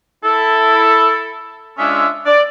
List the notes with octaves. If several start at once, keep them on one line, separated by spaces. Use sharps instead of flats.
E4 A4
G#3 C#4 D4 F4 E5
D5